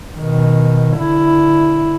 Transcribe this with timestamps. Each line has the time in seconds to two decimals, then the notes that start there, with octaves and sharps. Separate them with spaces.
0.18 B2 D#3
0.98 D3 E4